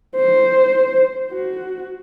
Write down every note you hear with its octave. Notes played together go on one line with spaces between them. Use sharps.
C5
F#4